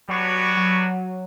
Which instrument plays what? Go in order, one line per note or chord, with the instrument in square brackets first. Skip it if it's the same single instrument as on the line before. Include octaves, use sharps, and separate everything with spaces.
[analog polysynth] F#3 [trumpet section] G3 B3 D4 F#4 C#5
[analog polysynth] F#3